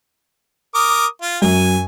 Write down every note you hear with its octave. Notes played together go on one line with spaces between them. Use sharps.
A#4 D6 D#6
F4
F#2 G#5